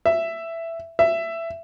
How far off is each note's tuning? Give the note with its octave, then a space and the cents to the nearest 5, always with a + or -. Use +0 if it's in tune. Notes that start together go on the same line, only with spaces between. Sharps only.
E5 +10
E5 +15